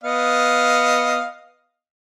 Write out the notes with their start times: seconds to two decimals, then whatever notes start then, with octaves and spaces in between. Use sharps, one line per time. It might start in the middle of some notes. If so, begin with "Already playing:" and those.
0.04 B3 D#5 F5